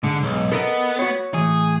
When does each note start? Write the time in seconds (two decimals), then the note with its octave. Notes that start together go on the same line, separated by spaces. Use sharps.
0.04 G#2 D3
0.23 B1
0.52 B3 A4 A#4 D#5
0.99 F#4 C#5
1.34 A2 E3 G#4